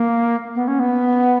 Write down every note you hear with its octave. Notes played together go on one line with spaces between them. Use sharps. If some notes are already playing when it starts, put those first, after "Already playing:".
Already playing: A#3
B3
C#4
B3